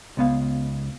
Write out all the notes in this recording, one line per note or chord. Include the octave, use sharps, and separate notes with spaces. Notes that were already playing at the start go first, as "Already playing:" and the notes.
C#2 B3 F5